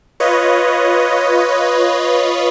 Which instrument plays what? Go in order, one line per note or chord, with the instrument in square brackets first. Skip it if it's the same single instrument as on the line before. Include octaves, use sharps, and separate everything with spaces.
[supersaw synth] F4 B4 C#5 D#5